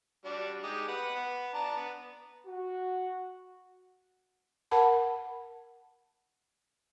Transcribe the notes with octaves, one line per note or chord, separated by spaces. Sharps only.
G3 D4 F#4
G#3 D#4 G4
B4 F#5
B3
D4 A5 A#5
B3
F#4
A#4 F#5 A5 B5